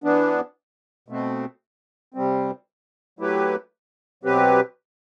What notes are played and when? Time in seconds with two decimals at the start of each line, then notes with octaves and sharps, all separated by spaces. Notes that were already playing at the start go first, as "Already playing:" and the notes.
0.04 E3 B3 D4
1.08 B2 A3 C4
2.14 C3 G3 C4
3.19 F#3 A3 E4 G4 B4
4.23 B2 F#3 C4 G4 B4